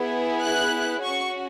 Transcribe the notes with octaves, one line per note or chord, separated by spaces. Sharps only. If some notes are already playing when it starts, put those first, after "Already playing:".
Already playing: B3 E4 G#4
F#6
C#4 F#4 C#6